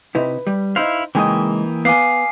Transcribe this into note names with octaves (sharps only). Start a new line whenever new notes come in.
C3 D#4 E4 B4
G3
D#4 E4 C5 F5
C#3 E3 G#3 A#3 D#4 G5 G#5 D#6
B3 F5 G#5 D6 C7